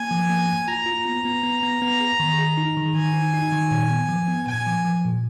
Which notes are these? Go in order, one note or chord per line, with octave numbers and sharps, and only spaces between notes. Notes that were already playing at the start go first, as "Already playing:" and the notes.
Already playing: A#3 G#5
F3
A#3
A#3
F4 A#5
F4
B3
B3
B3
B3
B3
G#4
D#3
G#4
D#4
D#3
D#3 G#5
D#4
D#4
D#3
A#2
B3
F3
B3
A#2 G#5
F3
F3
A#2